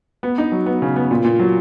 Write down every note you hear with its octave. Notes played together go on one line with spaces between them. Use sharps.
B3
D#4
F#3
B3
C#3
B3
A#2
A#2
F#3